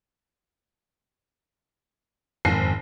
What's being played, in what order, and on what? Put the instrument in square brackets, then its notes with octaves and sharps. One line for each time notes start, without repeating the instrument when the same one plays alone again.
[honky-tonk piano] F#1 C7 [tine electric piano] F2 G#2 D#3